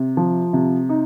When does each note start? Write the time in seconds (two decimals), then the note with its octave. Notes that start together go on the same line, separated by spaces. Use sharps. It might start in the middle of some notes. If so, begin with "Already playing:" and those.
Already playing: C3
0.17 F3
0.53 C3
0.89 D#4